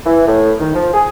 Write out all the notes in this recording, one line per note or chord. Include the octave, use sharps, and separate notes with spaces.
E3
A2
D#3
F3
G#4